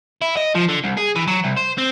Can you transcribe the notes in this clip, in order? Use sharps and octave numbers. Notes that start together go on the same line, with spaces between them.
E4
D#5
F3
D3
C2
G#4
E3
F#3
C2
C5
C4